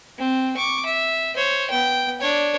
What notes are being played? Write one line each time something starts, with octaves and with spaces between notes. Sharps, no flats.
C4
C#6 D6
E5
C5 C#5
B3 G5
D4 C#5